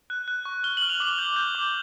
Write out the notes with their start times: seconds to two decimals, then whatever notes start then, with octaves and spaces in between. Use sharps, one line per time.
0.10 F#6
0.28 F#6
0.45 C#6
0.64 F6 G7
0.77 F#7
0.82 F6
0.89 F7
1.00 D6 F#7
1.18 G6
1.36 G6
1.55 D6